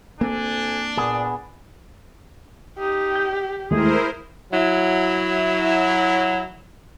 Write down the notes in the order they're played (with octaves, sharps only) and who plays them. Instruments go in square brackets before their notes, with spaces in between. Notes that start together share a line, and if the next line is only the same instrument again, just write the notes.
[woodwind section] D2 A4 G#5 [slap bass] A#3 C4 [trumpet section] D4
[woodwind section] A#2 [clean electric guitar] B3 G#4
[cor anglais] D#4 [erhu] G4
[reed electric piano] G6
[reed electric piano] D#2 G#3 A3 [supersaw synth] E4 A#4 C5 [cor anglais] G#4
[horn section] F#3 E4